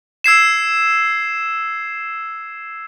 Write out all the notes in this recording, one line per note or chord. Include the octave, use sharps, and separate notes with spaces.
E6 G#6 C7 E7